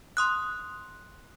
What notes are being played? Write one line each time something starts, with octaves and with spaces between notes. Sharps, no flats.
C6 D#6 F#6